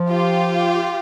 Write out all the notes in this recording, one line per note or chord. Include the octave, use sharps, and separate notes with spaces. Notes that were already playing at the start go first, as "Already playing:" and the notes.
Already playing: F3
F4 G4